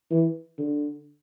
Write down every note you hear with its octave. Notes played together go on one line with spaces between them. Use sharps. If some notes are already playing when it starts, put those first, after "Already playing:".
E3
D3